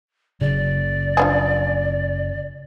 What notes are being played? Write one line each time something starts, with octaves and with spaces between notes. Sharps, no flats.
F#1 C#3 D5
F3 D4 G#4